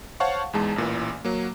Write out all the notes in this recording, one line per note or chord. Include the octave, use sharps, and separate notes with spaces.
C5 C#5 F5 F#5 A5 C#6
E2 G#2 G#3 A5
A1 A#2 E3
F#3 A#3